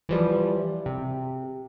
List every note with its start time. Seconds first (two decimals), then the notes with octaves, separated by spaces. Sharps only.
0.09 E3 F3 G3
0.86 C3